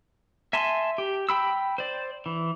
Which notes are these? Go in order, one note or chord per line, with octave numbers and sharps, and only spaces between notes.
E5 G#5 A5 C6
G4
G5 B5 E6
C5 D5
E3